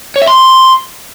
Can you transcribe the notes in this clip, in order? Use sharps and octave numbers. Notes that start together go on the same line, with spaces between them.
C#5
E5
C6